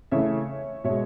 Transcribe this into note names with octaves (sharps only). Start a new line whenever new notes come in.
C#3 E3 A3 C#5 E5
B2 G#3 C#5 E5